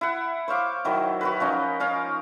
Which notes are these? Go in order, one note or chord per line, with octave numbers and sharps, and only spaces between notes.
E4 F#5
C5 C#5 F5 D6
D#3 F#3 E4
F#4 A#4 B4
F3 C#4 D#4
C#4 A#4 F5